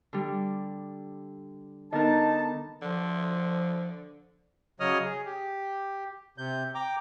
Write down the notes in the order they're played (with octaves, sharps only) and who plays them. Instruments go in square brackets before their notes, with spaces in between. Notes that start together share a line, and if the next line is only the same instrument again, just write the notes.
[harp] D3 G3
[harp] D3 B3 A#4 [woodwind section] D#4 A5
[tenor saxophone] D3 [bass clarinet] F3
[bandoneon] C#3 F#3 C#5 D#5 D#6 F6
G#4
G4
C3 G6
G5 A#5 D6